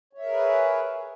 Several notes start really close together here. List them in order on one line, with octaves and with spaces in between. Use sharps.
C#5 E5 A#4 G#4 B4